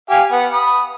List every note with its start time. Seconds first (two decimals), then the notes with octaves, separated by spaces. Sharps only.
0.10 G4 F5 G#5
0.32 B3 F#5
0.53 B5 D#6